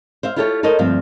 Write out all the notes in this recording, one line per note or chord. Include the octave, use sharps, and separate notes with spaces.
C5 E5 F5
E4 F4 G4 A4 C5 C#5
A4 A#4 C5 C#5 D#5
D2 G2 F3 C4 F5